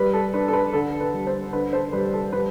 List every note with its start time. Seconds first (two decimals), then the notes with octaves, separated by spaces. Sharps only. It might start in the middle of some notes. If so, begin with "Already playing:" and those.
Already playing: G3 B4
0.14 A4
0.34 D4 B4
0.48 A4
0.53 B4
0.73 D3 A4
1.00 B4
1.14 G3
1.27 A4 C5
1.53 D3 B4
1.73 A4 C5
1.93 G3 B4
2.14 A4
2.33 G3 B4